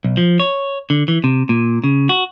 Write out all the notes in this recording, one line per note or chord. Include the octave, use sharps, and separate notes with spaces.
B1
F3
C#5
D3
E3
C3
A#2
C#3
F#4